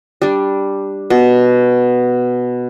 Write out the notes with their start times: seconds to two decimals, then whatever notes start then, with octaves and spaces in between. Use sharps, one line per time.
0.22 G3 D4
1.10 B2